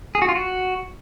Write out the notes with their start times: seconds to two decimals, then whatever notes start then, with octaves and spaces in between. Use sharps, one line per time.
0.15 G#4
0.22 F#4
0.29 F4
0.35 F#4